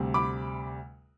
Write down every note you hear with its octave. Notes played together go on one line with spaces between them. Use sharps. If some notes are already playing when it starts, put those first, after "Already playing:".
Already playing: D2 C3 G3
B5 D6